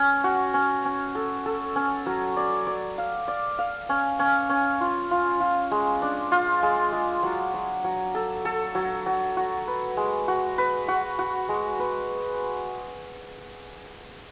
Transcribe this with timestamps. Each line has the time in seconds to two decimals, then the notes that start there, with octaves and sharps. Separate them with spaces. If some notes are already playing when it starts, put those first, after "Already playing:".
Already playing: C#4
0.24 F#4
0.54 C#4
0.85 C#4
1.15 A4
1.46 A4
1.76 C#4
2.06 F#3
2.36 D5
2.67 D5
2.98 F5
3.28 D5
3.59 F5
3.89 C#4
4.19 C#4
4.50 C#4
4.81 F4
5.11 F4
5.40 F4
5.71 G#3
6.02 D4
6.32 F4
6.63 G#3
6.93 G#3
7.23 F#3
7.54 F#3
7.84 F#3
8.14 A4
8.45 A4
8.75 F#3
9.06 F#3
9.37 F#4
9.67 B4
9.97 G#3
10.28 F#4
10.58 B4
10.88 F#4
11.19 F#4
11.49 G#3
11.79 B4